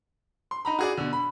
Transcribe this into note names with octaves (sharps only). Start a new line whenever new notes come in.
C6
D#4 A#5 B5
F#4 G#4 D5
B2 D3
B5